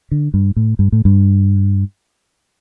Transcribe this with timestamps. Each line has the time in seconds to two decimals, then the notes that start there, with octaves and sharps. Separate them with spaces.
0.11 D3
0.34 G2
0.56 A2
0.79 G2
0.92 A2
1.05 G2